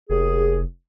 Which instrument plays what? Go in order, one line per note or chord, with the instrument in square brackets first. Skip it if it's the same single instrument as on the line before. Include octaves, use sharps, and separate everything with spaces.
[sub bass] F1 [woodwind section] D#2 G#4